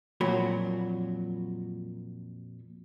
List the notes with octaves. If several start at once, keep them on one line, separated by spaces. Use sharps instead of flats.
F2 A#2 F#3 F#4 B5